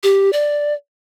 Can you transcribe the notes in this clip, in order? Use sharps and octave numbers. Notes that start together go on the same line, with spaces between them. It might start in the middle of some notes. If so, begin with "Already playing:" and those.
G4
D5